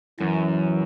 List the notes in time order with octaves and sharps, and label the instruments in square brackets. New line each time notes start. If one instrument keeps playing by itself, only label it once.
[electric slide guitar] F#2 [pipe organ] E3